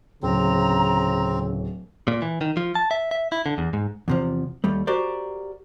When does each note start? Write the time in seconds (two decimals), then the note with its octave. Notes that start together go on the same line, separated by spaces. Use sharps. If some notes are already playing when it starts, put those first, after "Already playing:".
0.23 D1 C#3 C4 A#5
2.08 A#2
2.22 E3
2.41 D#3
2.57 F3
2.75 A5
2.91 E5
3.11 E5
3.32 E4
3.46 D3
3.58 E2
3.73 G#2
4.08 E2 C3 F3
4.64 D#2 G3 A3
4.87 F#4 G4 A#4 C5 D5